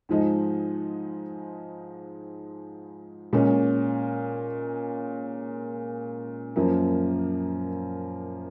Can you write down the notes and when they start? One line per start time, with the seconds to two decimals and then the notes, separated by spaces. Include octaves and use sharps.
0.09 G#2 F3 G#3 D#4
3.33 A#2 G#3 C#4
6.56 F#2 F3 A#3